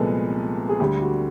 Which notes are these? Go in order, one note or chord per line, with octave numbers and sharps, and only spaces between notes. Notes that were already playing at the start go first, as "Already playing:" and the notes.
Already playing: C2 A#2 F3 G#3 B3 A4
G#4
D2 D3 G3 G4
F#4